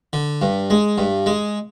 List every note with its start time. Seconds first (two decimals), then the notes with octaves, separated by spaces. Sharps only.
0.13 D3
0.42 G2
0.70 G#3
0.98 G2
1.26 G#3